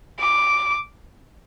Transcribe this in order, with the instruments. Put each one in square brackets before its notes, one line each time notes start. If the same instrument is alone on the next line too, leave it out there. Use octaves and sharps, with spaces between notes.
[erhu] D6